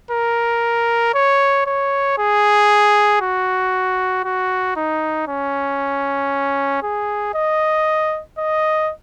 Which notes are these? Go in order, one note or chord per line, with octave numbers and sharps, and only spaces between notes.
A#4
C#5
C#5
G#4
F#4
F#4
D#4
C#4
G#4
D#5
D#5